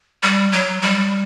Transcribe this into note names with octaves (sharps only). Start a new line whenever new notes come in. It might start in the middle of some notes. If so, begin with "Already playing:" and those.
G3
F#3
G3